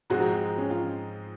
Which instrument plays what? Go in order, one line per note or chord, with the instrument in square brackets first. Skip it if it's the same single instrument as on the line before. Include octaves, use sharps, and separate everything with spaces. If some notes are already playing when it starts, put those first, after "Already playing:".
[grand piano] G#2 F3 G#3 C4 D#4 [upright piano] F#4
[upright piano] C#4
F4